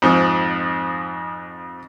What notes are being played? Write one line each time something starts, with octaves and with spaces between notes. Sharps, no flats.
F2 G#2 F3